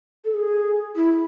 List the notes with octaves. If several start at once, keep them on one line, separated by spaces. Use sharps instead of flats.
A4
G#4
E4